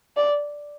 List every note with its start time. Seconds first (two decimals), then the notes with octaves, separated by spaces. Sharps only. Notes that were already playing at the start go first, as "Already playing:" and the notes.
0.17 D5